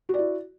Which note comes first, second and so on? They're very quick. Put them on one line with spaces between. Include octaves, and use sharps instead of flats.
F#4 D5 E4